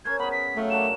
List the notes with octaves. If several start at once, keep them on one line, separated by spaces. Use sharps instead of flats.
C#4 A#4 C5 G#6
B3 G#4 B5
B6
F#3 A3 F4
D4 F#4 A#4 E7